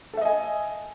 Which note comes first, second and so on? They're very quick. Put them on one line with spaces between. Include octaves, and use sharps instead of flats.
A4 E5 D#5 G#5